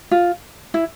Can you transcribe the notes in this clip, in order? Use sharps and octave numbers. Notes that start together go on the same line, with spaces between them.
F4
E4